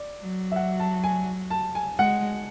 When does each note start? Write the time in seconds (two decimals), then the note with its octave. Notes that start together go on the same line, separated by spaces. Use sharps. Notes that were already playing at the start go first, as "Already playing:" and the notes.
Already playing: D5
0.20 F#3
0.52 E5
0.56 F#5
0.80 A5
1.04 G#5
1.50 A5
1.75 G#5
1.98 G#3 F#5